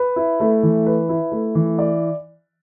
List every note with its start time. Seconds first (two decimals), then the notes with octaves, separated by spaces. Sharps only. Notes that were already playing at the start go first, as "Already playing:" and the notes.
Already playing: B4
0.16 E4
0.40 A3
0.63 E3
0.86 B4
1.09 E4
1.32 A3
1.55 E3
1.79 D5